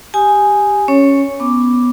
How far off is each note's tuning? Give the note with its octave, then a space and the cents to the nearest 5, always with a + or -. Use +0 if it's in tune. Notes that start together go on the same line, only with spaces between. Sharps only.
G4 +5 G#5 +0 D#6 +0
C#4 +0 C#5 +0
B3 +0 D6 +0